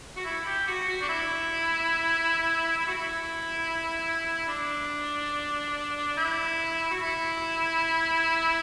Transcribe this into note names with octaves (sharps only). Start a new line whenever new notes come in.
F#4
E4
G4
F#4
F#4
D4
E4
E4
F#4
E4
D4
E4
F#4
E4